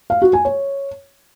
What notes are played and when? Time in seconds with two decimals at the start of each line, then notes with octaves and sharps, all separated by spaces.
0.10 F5
0.22 F#4
0.33 G#5
0.45 C#5